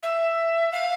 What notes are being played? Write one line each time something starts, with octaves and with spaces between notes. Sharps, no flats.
E5
F5